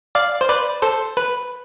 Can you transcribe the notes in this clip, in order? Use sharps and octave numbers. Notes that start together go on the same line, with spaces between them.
D5 F5
C5
B4 D5
A4 C5
B4